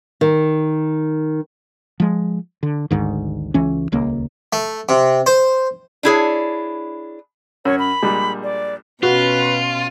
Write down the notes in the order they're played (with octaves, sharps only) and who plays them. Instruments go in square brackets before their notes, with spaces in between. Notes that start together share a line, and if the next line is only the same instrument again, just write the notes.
[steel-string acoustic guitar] D#3
[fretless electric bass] F3 G#3
D3
G#1 D2 G#2 D#3
C#2 E3 C#4
D#1 C#2 A#3
[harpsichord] A3
C3
C5
[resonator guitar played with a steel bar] D4 E4 G#4 C#5
[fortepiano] F#2 [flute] C#5
[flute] B5
[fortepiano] A#1 G3 G#3
[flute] D5
[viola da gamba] B2 C#4 [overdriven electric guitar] F4 [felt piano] F#4 [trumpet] B4